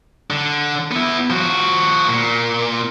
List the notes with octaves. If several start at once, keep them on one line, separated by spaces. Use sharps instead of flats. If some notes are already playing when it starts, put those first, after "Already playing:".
D3
B3 E4
F3 F#4
A#2